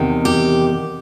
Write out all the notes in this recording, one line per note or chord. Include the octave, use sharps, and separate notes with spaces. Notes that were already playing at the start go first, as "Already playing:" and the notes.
Already playing: E2 C3 D#3
G4